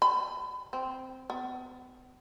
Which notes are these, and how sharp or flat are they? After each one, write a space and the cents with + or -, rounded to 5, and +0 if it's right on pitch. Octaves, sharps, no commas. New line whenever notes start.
B5 +25
C4 -5
B3 +40